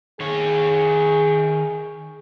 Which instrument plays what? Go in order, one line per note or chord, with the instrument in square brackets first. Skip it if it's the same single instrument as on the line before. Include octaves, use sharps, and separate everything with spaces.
[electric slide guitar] D#3 C#5 [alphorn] G#4